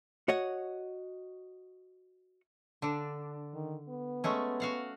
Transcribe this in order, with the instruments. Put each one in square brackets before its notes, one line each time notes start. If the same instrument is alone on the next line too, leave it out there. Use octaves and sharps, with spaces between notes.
[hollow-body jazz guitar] F#4 C#5 D#5 F#5
[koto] D3 D4
[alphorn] D#3
B3
[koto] G#3 A3 C#4
F#4 F5 F#5